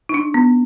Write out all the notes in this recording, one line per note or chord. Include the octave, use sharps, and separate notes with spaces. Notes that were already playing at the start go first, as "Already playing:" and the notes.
D#4
D4
B3